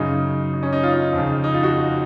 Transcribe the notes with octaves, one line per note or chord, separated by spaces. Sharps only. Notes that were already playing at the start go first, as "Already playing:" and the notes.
Already playing: F#2 C#3 D#4
D#4
C#4
D#4
F4
D#4
F2
C#3
D#4
F4
F#4
F#4